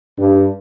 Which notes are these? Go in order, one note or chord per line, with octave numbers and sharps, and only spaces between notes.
G2